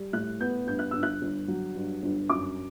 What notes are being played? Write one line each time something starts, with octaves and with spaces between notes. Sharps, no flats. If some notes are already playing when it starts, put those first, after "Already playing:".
Already playing: G3
A2 F#6
B3 G6
G2 G6
F#6
G1 E6
F#6
G1
F#3
G2
G1
F#2 D6